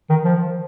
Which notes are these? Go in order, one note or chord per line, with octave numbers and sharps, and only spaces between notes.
D#3
F3